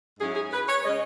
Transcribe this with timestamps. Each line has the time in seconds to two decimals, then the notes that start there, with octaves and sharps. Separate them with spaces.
0.20 G#2 F#3 C#4 E4 G#4
0.36 G#4
0.53 B4
0.68 C#5
0.84 C#3 G#3 C#4 D#5